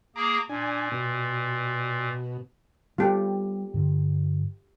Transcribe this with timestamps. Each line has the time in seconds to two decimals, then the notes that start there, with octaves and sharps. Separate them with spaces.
0.16 A#3 G#4 A#5 D6
0.49 A#2 D4 G#5
0.91 B2
2.98 G3 B3 F4 G4 A4
3.74 G2 D3